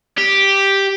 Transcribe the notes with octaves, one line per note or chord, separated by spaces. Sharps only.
G4